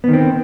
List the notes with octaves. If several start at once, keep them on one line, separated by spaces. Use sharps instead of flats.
D#3 B3 C4